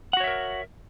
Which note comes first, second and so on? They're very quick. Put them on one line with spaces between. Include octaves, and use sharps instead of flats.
F#5 F#4 C#5 E5 A#4